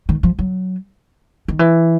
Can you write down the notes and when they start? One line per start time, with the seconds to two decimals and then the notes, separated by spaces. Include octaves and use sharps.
0.09 D#3
0.23 F3
0.39 F#3
1.48 D#3
1.59 E3